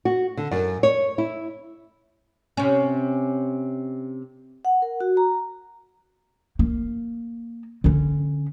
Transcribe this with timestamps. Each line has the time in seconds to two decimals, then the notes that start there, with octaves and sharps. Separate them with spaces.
0.05 F#4
0.37 D3
0.51 F#2
0.83 C#5
1.18 E4
2.57 C3 C#4
4.65 F#5
4.82 A#4
5.01 F#4
5.17 A#5
6.59 A#3
7.84 D3 C#4